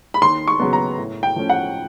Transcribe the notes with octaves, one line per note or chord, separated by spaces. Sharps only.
B5
D#2 C6
C#6
C#3 F#3 B3
A#5
A2
G5
F3 A3 C#4
F#5